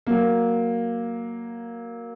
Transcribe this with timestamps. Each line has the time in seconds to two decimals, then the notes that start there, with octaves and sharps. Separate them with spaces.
0.07 F#3 A#3